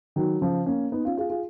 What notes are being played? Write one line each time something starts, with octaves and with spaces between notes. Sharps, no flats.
D#3 F#3
C#3 F3
A#3 C#4
B3 D#4
C#4 F4
F4 G#4
F4 G#4